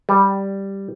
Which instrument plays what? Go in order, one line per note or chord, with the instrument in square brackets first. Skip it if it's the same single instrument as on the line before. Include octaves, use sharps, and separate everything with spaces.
[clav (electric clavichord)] G3